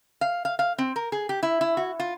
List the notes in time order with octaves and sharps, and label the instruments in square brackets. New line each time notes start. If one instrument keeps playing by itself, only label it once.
[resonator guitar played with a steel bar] F5
F5
F5
C4
A#4
G#4
G4
E4
E4
F#4
F4